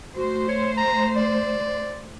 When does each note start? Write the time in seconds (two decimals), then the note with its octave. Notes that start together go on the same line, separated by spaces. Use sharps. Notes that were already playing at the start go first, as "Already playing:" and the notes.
0.17 A3 F#4 C5
0.48 C#5
0.77 A#5
1.16 D5